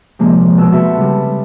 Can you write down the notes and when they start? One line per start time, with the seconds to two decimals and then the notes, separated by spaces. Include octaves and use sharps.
0.19 C3 F3 G#3 A#3
0.58 B2 E6
0.72 C4 F#4 A4 B4 E5
0.97 C#3 G3